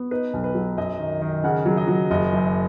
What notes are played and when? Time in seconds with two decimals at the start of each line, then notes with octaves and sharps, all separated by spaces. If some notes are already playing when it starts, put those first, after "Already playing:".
Already playing: B3
0.11 D#4 B4
0.34 B1
0.44 B4
0.55 F#3
0.77 F#2 D#5
0.99 D#3
1.22 D#3
1.44 C#3 F#5
1.66 F#3
1.77 D#5
1.88 F#3
2.11 F#1 D#5
2.32 F#2